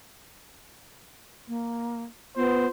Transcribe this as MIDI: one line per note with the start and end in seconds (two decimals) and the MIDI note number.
1.48 2.03 58
2.36 2.66 59
2.36 2.69 65
2.36 2.69 72